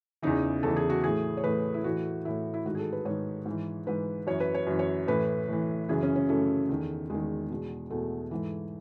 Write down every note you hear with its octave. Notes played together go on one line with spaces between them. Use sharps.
E2 C#3 E3 D#4
E2 C#3 E3 A4
G#4
F#4
A2 E3 G#4
C#5
A2 E3 B4
E4
A2 E3 F#4
A2 E3 E4
E4
G#2 D#3 F#4
G#4
A4
B4
G#2 D#3 C#5
G#2
E3
G#2 E3 B4
F#2 E3 C#5
B4
C#5
F#2 E3
C#5
A2 E3 B4
A2 E3
F#2 C#3 E3 G#4
C#4
C#4
F#2 C#3 E3 A3
E2 D#3
E2 D#3 G#3
E2 B2
E2 B2 A3
G#2 E3